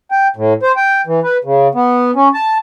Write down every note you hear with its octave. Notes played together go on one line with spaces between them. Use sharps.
G5
A2
C5
G5
E3
B4
C#3
B3
C#4
A5